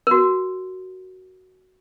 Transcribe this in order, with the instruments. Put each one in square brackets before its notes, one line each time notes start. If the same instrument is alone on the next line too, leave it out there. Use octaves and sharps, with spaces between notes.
[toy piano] F#4 A#4